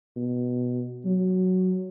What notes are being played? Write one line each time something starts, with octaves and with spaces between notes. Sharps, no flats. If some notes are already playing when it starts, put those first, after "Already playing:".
B2
F#3